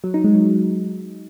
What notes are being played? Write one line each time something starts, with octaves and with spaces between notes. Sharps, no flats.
F#3
D#4
G#3
F#3
F#3